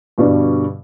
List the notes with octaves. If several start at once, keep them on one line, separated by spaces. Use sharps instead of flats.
G2 B2 D3 G3